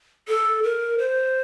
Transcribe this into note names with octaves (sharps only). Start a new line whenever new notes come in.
A4
A#4
C5